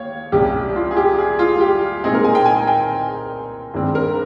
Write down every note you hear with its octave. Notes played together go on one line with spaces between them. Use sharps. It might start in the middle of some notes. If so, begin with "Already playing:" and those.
Already playing: D#2 C#5 F5
C2 C3 G3 C#4 G4
F4
G#4
G4
G#4
F4
G4
A#2 G#3 C4 D#4 G#4
A#4
G#5
G5
G#5
G#5
G5
G2 D#3 G#3 C4
A#4